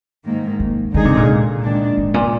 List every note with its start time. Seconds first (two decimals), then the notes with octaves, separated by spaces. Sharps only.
0.25 G#2 D#3 A#3
0.60 A#3
0.94 D3 D#3 G#3 D#4 G#4
1.05 C3
1.17 A#2
1.62 D#3 G#3 D4
1.98 G#2
2.14 A#2